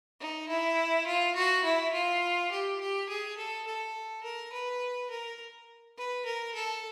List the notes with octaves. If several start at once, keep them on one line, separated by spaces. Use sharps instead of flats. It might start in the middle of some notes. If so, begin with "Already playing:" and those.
D#4
E4
F4
F#4
E4
F4
G4
G4
G#4
A4
A4
A#4
B4
A#4
B4
A#4
A4